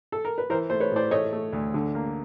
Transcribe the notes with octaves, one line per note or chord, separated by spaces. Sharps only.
A4
A#4
B4
E3 A#4 C5
A3 C5
B4 C#5
A2 C5 D5
A3 C#5 D#5
A3
D2
D3
A#3